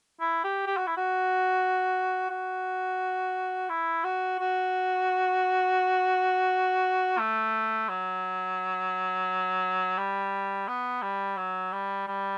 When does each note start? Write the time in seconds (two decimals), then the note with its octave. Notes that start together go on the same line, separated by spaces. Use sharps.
0.20 E4
0.44 G4
0.67 G4
0.77 F#4
0.87 E4
0.97 F#4
2.30 F#4
3.70 E4
4.04 F#4
4.39 F#4
7.18 A3
7.89 F#3
9.98 G3
10.68 B3
11.02 G3
11.37 F#3
11.72 G3
12.07 G3